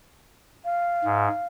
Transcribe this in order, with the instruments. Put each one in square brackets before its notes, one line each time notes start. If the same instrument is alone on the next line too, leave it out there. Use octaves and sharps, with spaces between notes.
[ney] F5
[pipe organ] G#2